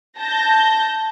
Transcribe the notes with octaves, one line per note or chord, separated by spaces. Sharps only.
A5 G6 A#6